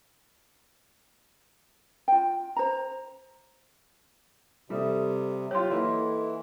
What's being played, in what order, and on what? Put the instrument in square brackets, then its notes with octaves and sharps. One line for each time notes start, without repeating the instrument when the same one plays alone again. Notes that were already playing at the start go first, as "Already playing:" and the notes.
[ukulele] F4 G5
C5 A#5
[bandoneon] C3 [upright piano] G3 [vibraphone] A4 E5 D#6
[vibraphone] F#3 [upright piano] F4 G4 [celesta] C#5 C6
[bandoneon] E3 [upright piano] A#3 E4 [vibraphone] A4 D#5 F#5